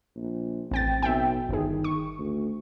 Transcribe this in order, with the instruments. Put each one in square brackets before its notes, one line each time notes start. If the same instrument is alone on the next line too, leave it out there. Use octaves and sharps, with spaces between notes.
[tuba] A#1
[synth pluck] A1 G5 A6 [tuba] C4
[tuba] B1 [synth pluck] E5 G5
[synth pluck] G1 G#4 [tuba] D#3
[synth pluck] C#6
[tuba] D2